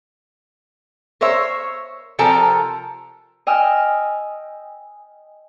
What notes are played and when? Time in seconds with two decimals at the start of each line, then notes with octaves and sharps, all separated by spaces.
1.21 A#4 C5 C#5 E5
2.19 C3 F3 A4 A#4 A5 A#5
3.47 D#5 G5 G#5 E6 F6